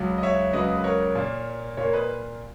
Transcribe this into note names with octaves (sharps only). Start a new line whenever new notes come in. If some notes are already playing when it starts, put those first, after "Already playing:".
Already playing: C#2 C#3 F#3
D#5
C#5 E5
C#2 C#3 F#3 B4 D#5
B4
A#4 C#5
A#2 A#3
A#2 A#3 A#4 C#5
B4 D#5